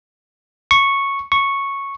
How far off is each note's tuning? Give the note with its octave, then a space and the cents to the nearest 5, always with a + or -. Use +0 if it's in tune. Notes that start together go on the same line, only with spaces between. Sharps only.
C#6 -5
C#6 -5